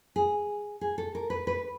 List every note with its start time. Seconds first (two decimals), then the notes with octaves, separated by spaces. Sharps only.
0.16 G#4
0.81 G#4
0.98 A4
1.15 A#4
1.30 B4
1.47 B4